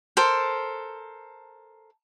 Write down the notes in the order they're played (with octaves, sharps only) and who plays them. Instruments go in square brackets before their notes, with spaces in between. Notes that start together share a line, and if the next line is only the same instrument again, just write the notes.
[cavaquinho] A4 A#4 C5